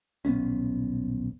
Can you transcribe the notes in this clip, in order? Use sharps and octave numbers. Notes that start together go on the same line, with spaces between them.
D#1 B1 B3 C#4